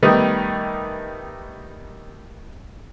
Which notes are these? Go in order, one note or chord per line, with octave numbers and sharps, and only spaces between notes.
D#3 G3 A3 B3 D#4